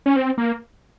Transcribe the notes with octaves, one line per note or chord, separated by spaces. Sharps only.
C#4
C4
A#3